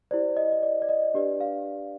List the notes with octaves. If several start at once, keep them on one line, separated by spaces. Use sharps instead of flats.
E4 G4 C5 D5
D#5
D#5
D5
D5
D#5
D4 G4 B4 D5
F5